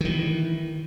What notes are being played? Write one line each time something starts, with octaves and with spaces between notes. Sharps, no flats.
D#3 E3